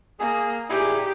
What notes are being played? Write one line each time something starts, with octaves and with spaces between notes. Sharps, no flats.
A#3 G#4
A#2 D#4 E4 G4 G#4